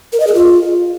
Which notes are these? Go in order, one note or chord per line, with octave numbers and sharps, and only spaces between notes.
A#4
D#5
G#4
F4